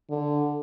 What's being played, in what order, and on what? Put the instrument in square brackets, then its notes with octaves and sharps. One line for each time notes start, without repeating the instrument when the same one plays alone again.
[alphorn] D3